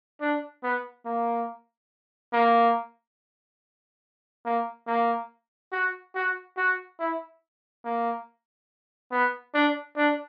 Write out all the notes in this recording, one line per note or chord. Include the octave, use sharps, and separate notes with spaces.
D4
B3
A#3
A#3
A#3
A#3
F#4
F#4
F#4
E4
A#3
B3
D4
D4